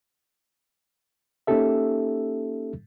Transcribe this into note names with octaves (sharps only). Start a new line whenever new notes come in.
A#3 C#4 D#4 G4 A4 E5